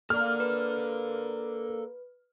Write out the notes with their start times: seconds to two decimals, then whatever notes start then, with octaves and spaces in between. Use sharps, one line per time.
0.10 A#3 A4 D5 F6
0.40 B4